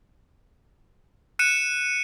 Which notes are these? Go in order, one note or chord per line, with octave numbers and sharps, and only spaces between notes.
F#6 C#7 D#7 E7